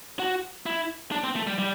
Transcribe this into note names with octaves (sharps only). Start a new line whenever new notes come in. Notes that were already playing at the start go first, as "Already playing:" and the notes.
F#4
E4
D4
C4
A3
G3
G3